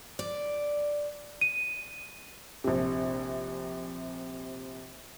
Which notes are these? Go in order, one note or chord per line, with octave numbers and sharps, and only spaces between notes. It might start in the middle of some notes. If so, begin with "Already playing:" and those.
D5
D#7
A#1 C3